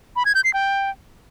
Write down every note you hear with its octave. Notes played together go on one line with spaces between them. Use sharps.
B5
G#6
G6
C7
G5